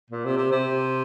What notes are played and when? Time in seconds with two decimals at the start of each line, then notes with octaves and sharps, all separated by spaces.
0.10 A#2
0.25 C3
0.37 C3
0.52 C3